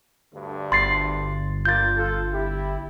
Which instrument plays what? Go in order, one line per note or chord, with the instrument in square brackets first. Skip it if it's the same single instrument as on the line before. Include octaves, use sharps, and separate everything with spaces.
[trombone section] D2 G2 D3
[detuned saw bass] G1 [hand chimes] C6 A6 C7
[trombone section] G3 A#3 F4 [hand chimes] G6 A6
[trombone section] F4 A4
E4 G4